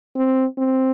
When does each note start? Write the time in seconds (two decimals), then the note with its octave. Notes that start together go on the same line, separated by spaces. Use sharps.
0.16 C4
0.58 C4